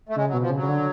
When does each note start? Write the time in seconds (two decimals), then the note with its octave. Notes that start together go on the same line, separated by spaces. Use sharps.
0.09 A3
0.16 C#3 G#3
0.28 F#3
0.33 B2
0.41 F3
0.50 C#3
0.55 F#3
0.62 C#3
0.69 D3